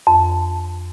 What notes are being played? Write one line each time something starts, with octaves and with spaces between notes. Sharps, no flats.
F2